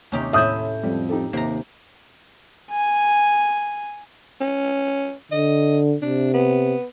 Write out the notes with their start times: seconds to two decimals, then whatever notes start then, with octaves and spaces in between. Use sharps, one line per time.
0.12 D#2 C3 C#4 D#4 G4
0.33 A2 E4 E5 D#6 G6
0.83 F2 G3
1.09 D#4 G4 A4
1.33 D#2 C3 A#5
2.71 G#5
4.41 C#4
5.32 D3 D#5
6.02 C3 D4
6.34 B3